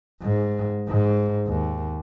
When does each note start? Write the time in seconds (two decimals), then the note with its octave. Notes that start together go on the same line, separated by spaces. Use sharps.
0.22 G#2
0.89 G#2
1.47 D#2